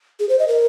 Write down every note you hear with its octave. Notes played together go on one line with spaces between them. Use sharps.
G#4
C5
D#5
A#4